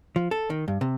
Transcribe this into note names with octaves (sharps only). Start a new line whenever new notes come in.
F3
A4
D#3
G2
C3